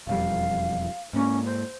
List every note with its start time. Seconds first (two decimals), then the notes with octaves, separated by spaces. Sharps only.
0.07 E1 F2 G3 F5
1.13 G#2 A#3 C#4
1.45 C5